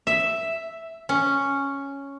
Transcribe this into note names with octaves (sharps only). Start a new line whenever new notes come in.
E5
C#4